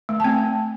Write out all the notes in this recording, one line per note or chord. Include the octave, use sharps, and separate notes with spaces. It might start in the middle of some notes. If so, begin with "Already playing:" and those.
A3
A5
C4 G5